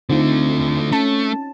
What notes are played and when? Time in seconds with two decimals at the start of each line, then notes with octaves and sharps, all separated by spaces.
0.09 D3 A3 C4 D#4 F4
0.91 A3 C#4 A5